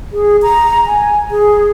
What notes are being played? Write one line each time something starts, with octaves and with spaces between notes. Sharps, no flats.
G#4
A#5
G#5
G#4